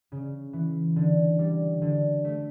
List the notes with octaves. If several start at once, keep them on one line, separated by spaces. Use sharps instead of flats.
C#3
E3
D3
G3
D3
A3